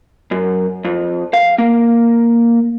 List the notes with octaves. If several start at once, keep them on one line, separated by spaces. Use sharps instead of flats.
F#2
F2
F5
A#3